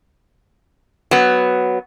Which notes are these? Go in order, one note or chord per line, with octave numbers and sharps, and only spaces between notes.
F#3 B3